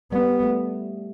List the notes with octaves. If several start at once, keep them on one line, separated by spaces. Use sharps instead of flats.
G3 B3
A3